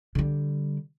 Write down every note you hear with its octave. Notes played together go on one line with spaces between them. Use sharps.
D3 G3